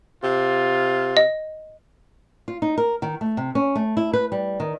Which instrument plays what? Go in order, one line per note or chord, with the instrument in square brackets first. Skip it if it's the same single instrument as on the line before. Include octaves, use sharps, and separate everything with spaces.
[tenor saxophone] C3 [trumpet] F4
[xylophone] D#5
[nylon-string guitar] F4
D#4
A#4
D#3
A3
C3
C#4
A3
E4
B4
G3
D#3